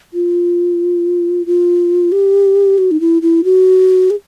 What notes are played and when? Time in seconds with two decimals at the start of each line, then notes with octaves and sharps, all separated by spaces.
0.14 F4
1.46 F4
2.12 G4
2.78 F#4
2.91 D#4
3.00 E4
3.22 E4
3.44 F#4
4.10 G#4